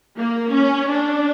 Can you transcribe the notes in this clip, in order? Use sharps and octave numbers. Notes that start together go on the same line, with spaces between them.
A#3
C#4
D4